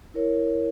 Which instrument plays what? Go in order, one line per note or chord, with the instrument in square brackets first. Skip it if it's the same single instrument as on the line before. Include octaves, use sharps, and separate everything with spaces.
[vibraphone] E4 A#4 C#5